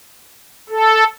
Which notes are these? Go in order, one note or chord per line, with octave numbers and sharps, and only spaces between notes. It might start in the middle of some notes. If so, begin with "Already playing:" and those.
A4